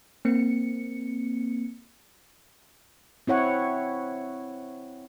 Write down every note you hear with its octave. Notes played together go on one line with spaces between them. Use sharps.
A#3 C4 C#7
C4 E4 C#5 F#5